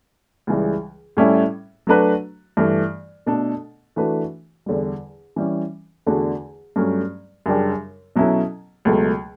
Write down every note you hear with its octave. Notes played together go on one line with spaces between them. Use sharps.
C#2 C#3 E3 G3
A2 G3 C#4 E4 A4
F#3 A3 D4 F#4 B4
G2 E3 A3
B2 A3 D4 A4
E3 A3 D4 F#4 B4
E2 D3 G3
E3 G3 C#4
E2 D3 A3 D4 F#4
G2 F#3 A3 C#4
F#2 C#3 G3 D4 G4
B2 F#3 C#4 E4 A4
C#2 B2 F#3 A3